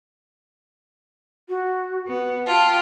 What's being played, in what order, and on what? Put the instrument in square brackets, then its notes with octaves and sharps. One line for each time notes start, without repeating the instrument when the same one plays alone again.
[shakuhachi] F#4
[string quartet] B3
[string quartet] F4 G4 [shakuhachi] A5